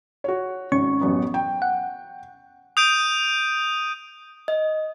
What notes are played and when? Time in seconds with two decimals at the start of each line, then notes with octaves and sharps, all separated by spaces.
0.24 F#4 C#5
0.72 G#1 C#4 C#6
1.01 A1 F#2 B3
1.34 G5
1.62 F#5
2.77 D#6 G6 D7 D#7
4.48 D#5